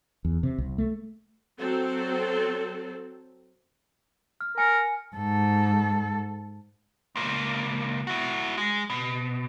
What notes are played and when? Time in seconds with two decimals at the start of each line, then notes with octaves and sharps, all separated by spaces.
0.25 E2
0.43 C3
0.58 C2
0.78 A3
1.57 F#3 C4 A4
4.41 F6
4.58 A#4 G#5 F6 C#7
5.16 G#2 A4
7.16 C#2 A#3
8.07 E4 F#4
8.58 G#3
8.90 B2